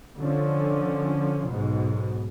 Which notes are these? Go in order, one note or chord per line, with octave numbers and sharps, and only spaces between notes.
D3 F3 C#4
B1 G#2 B2